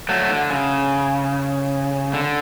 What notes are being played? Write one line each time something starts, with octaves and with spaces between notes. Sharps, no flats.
F#3 A3
D3
C#3
D3